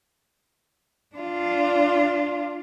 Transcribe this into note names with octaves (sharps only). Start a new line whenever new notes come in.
D4 F4